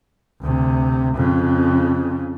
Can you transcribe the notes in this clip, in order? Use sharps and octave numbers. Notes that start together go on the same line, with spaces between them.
D2 C3
F2 C#3